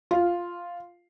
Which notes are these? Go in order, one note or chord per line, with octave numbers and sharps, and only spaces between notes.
F4